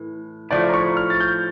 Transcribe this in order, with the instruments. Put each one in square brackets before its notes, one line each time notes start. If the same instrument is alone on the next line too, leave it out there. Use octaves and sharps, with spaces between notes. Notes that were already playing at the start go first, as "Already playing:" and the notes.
Already playing: [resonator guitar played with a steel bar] A2 E3
[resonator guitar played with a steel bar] A2 F3 A3 [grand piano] D5
[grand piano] A#5
C#6
F6
A6
G6